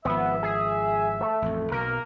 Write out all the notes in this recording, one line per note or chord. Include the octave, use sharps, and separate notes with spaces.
G#1 F3 B3 E5
G#4
A3
A1 F2
B1 B2 A#3 A#4